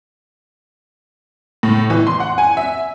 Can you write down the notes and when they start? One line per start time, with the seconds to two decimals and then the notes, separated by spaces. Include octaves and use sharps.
1.63 A2
1.90 E3
2.07 C6
2.20 F#5
2.38 G#5
2.57 E5